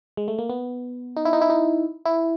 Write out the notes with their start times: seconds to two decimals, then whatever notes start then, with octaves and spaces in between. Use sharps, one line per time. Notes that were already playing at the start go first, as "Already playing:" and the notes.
0.17 G#3
0.28 A3
0.39 A#3
0.50 B3
1.17 D#4
1.25 E4
1.33 D#4
1.41 E4
1.50 D#4
2.05 E4